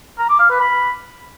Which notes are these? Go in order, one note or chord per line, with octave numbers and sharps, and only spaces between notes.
A#5
D6
F5
B4
B5